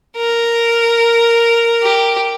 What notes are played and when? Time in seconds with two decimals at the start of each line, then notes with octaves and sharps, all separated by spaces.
0.17 A#4
1.83 G4